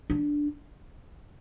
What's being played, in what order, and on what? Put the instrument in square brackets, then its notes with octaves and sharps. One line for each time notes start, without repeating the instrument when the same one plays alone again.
[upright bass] D4